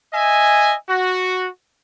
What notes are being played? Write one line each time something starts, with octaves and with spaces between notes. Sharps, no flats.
D#5 E5 G#5
F#4